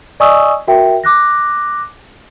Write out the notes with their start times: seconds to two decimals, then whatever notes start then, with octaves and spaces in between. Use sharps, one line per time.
0.20 D5 D#5 G#5 C#6 D#6 E6
0.67 F#4 A#4 E5 G5
1.04 D6 F#6 A#6